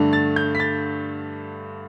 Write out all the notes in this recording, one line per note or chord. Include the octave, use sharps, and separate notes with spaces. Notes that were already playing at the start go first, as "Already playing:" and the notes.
Already playing: G2 D3 A3 D4
A6
G6
B6
A6